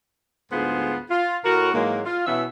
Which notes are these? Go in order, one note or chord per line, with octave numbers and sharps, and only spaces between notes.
D2 G#2 B3 F4 G#4 C5
F4
A2 F#4 A#4
G#2 E3 F#3 G#3 A#3
F4
B2 E3 B3 C#4 E5